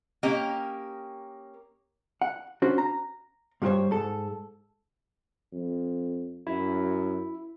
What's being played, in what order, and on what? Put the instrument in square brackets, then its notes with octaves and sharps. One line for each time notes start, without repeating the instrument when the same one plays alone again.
[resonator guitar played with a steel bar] A#3 C#4 G4 A#4 D#5
[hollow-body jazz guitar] F#5
C#4 D4 F#4 C5
A#5
G2 G3 F4 G4 C5 C#5
G#2 A4
[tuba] F2
[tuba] F#2 [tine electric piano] E4